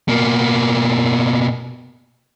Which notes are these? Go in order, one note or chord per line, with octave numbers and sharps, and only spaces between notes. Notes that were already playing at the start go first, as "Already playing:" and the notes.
B2 A#3